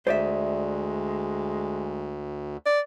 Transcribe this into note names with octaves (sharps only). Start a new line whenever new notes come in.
D2 G#3 C5 D5 E5
D5